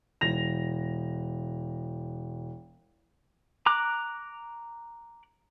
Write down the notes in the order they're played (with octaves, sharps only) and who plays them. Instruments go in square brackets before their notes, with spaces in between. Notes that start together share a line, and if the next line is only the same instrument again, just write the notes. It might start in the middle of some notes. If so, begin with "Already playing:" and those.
[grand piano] E1 A#6 F7
[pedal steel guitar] A#5 D6 F#6